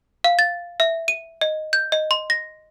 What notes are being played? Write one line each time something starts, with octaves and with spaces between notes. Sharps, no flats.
F5
A6
E5
D#7
D#5
G6
D#5
C6
A#6